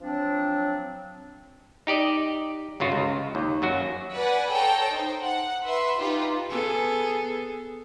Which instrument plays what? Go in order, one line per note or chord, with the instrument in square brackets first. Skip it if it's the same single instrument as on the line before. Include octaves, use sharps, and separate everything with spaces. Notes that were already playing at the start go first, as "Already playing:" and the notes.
[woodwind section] F3 F#3 C4 D4
[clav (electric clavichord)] D#4 G4 D5 D#5
G1 C#3 F4 F#4
C#2
D#2
F#2 F#3 F#4
[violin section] B4 D5 F#5 G#5
A4 C#5 G5 A5 A#5
D#4 C5
F#5
B4 E5 C6
D#4 F4 G4 B4
[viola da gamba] B3 G#4 A4